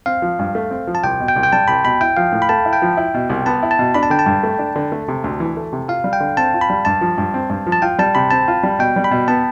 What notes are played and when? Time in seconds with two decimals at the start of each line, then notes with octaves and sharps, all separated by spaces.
0.06 C4 F5
0.22 F3
0.39 G2
0.55 A3
0.71 C4
0.87 F3
0.95 A5
1.03 C2 G5
1.20 B2
1.28 G5
1.36 C2
1.43 G5
1.53 G3 A5
1.68 C2 B5
1.85 B2 B5
2.01 E4 G5
2.17 F3 F5
2.32 A2
2.42 B5
2.49 A3 A5
2.65 E4
2.73 G5
2.82 F3
2.97 E4
3.14 B2
3.29 C2
3.46 B3 A5
3.63 E4
3.71 A5
3.79 B2
3.95 D4 B5
4.03 A5
4.10 D3 G5
4.19 A5
4.26 G2
4.43 A3
4.59 D4
4.76 D3
4.92 A3
5.08 C3
5.24 D2
5.40 E3
5.57 A3
5.73 C3
5.88 F4 F5
6.04 G3
6.13 G5
6.20 D3
6.37 C4 A5
6.54 F4
6.61 B5
6.70 G3
6.85 G2 A5
7.01 F3
7.18 G2
7.34 C4
7.50 G2
7.67 F3
7.72 A5
7.82 F4 G5
7.99 G3 A5
8.15 C3 B5
8.31 C4 A5
8.48 F4
8.63 G3
8.79 B2 G5
8.96 G3
9.04 B5
9.11 B2
9.28 B3 A5